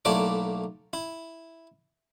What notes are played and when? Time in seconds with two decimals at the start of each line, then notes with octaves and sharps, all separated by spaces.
0.05 B1 A3 A#3 E4 D5 D6
0.93 E4